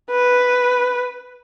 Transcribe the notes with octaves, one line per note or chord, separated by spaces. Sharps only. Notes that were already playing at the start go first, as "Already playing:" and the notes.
B4